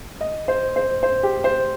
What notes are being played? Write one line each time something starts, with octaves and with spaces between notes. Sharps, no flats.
D#5
C5
C5
C5
G4
C5